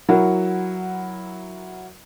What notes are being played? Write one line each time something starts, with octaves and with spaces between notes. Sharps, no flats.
F#3 E4 A#4 F#5